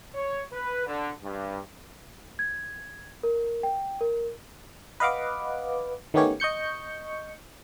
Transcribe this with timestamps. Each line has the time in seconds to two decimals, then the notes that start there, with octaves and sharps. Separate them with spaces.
0.13 C#5
0.52 B4
0.86 D3
1.23 G2
2.39 G#6
3.23 A#4
3.63 G5
4.01 A#4
5.00 B4 D#5 F5 F#5 D6
6.14 D#3 A3 B3 C#4 G4 C#5
6.40 D#5 C#6 G6 C#7